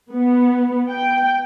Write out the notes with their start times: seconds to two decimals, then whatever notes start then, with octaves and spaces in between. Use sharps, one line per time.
0.12 B3
0.89 G5